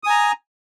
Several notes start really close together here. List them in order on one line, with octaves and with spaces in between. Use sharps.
D#6 G#5 A#5